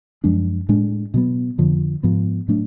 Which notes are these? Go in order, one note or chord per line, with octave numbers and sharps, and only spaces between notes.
F#2 F3 G#3 D4
A2 G#3 D4
B2 F#3 B3
F2 D3 F3
G#2 F3 B3
A2 F#3 A3 D4